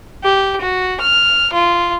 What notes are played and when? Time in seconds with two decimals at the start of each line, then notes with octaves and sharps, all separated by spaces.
0.24 G4
0.61 F#4
1.01 F6
1.53 F4